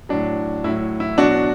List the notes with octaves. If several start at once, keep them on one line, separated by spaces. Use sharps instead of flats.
A2 F#3 D4
A2 F#3 E4
E4
B2 F#3 D4 F#4